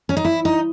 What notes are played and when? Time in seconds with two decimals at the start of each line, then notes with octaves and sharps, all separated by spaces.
0.09 C#4
0.17 D#4
0.25 E4
0.45 D#4